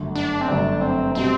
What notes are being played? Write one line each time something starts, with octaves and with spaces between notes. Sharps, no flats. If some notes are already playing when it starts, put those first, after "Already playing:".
Already playing: G1 F#2 D3 A3
D4
C4
G1 F#2 D3 A3 D4
C4
B2 G3 C4